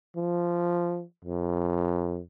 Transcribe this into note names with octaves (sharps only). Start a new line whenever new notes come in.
F3
F2